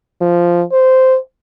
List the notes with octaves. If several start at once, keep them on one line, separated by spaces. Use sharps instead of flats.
F3
C5